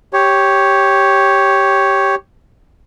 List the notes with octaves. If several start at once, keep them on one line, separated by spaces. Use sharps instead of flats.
G4 C#5